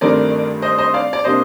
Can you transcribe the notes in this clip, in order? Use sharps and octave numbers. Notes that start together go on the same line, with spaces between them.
G1 G2 D#3 A3 C4 A#4 D5
C5 D#5
C5 D#5
D5 F5
D5
C3 G3 A#3 D4 C5 D#5